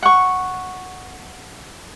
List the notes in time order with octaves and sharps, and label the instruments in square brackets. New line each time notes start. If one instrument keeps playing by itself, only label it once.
[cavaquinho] F#5 C#6